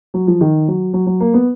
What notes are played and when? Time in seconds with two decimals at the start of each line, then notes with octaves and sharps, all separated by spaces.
0.14 F#3
0.27 F3
0.41 D#3
0.68 F#3
0.94 F#3
1.07 F#3
1.20 A#3
1.34 B3